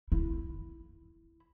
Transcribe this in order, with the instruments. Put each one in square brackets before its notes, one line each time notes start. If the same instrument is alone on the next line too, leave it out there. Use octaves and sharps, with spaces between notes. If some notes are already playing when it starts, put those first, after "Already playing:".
[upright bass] E4